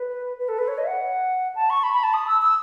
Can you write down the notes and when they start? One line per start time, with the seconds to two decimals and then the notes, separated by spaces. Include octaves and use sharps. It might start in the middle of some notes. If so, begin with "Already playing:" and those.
Already playing: B4
0.39 B4
0.49 A4
0.58 B4
0.68 C#5
0.78 D#5
0.84 E5
0.87 F#5
1.55 A5
1.70 C#6
1.83 B5
1.93 B5
2.03 A5
2.14 D#6
2.27 E6
2.42 E6